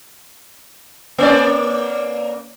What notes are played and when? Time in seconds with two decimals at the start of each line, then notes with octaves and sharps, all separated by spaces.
1.18 A#3 C#4 D5